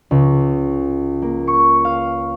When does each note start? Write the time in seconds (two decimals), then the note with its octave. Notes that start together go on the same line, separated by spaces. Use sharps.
0.11 C#2
1.22 A#3
1.47 C#6
1.85 F5